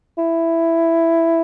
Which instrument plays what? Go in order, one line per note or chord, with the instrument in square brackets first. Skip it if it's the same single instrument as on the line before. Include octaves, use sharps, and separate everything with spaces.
[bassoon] E4